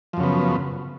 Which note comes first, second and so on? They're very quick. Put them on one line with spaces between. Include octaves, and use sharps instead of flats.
F3 F#2 C#3 B3